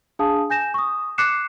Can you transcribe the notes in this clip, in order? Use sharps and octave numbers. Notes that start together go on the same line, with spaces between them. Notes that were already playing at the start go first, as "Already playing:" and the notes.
D4 G#4 F5 A5 D#6
G#5 G6 A#6 E7
C#6 D#6
D6 F#6 C7 C#7 E7